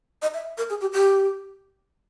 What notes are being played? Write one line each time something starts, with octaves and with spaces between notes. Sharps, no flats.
D#5
E5
A#4
G#4
G4
G4